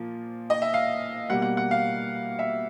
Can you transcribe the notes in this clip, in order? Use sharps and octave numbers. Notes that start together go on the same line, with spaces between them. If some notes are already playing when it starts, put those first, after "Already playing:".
Already playing: A#2 F3 A#3
D#5
E5
F5
B2 G3 A#3 F#5
F#5
F#5
F5
E5